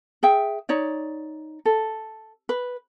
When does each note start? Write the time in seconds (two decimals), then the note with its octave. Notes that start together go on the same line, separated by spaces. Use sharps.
0.23 G#4 E5 G5
0.69 D#4 C#5 D5
1.66 A4
2.49 B4